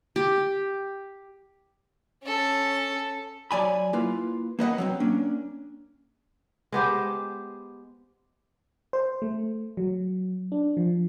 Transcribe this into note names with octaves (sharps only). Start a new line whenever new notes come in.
G4
C#4 A4
F#3 D5 G#5 B5
A#3 E4 F4 B4
A#3 B4 D#5 F#5
F#3 A#3 C4
A#3 C#4 D4
G#3 B3 G4 C5
C5
A3
F#3
D4
F3